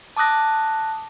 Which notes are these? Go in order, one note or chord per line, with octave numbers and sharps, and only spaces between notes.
A5 D6 D#6 F#6 A#6